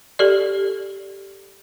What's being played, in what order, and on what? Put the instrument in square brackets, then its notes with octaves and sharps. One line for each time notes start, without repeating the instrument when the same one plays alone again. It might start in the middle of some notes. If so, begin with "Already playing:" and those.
[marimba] G4 A4 D5